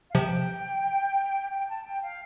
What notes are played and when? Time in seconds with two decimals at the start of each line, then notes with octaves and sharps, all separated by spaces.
0.10 F5
0.15 C3 F3 G5
1.51 G5
1.68 A5
1.85 G5
2.02 F5